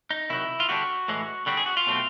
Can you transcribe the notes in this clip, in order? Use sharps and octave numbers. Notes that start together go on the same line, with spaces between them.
D#4
C3 D#3 F#3 E4
F4
D3 G3 B3 D4 F#4
A2 E3 G#3
D3 G3 C4 F#4
G#4
F#4
F4
B2 F#3 A3 C4